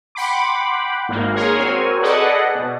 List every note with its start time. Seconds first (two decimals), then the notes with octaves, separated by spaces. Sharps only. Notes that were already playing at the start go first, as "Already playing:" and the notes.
0.15 F#5 G5 B5 C6 D6
1.09 G#1 A#3
1.34 G#4 A#4 C#5 C6 F6
1.57 C4 F#4 A#4 C#5 G#5
2.01 G#4 A4 B4 D5 D#5 F#5
2.55 B2